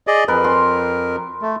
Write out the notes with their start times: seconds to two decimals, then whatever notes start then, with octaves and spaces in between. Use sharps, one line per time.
0.07 G#4 D5 D#5
0.28 F2 A#4 B4
0.44 C6
1.42 A3